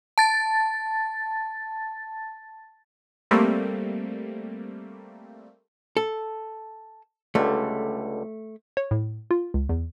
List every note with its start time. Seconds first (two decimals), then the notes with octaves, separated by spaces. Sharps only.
0.18 A5 A6
3.31 G3 A3 A#3 C4
5.97 A4
7.35 C#2 D3 G3 A3
8.77 C#5
8.91 A2
9.31 F4
9.54 C#2
9.69 E2